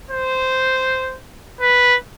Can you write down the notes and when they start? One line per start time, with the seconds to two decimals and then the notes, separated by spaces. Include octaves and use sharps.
0.11 C5
1.61 B4